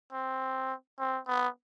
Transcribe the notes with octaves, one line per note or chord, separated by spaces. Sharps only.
C4
C4
B3